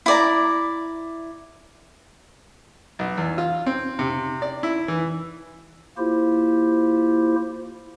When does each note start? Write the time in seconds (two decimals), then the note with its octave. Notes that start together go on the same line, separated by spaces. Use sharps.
0.06 E4 D5 A#5
2.99 B1
3.18 E2
3.38 F4
3.66 C4
3.99 C3
4.42 D5
4.63 E4
4.88 E3
5.98 A#3 E4 F4 G4 C5